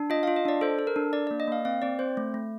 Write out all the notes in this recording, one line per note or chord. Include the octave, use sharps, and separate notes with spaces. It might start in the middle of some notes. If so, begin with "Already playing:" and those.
Already playing: D4
F4 D#5
F4 F5
D#5
D4 D5
A4 C5
A4
A#4
D4
D4 D5
A#3 D5
D#5
A#3 F5
C4 F5
C4 D5
C4 C5
A3
A3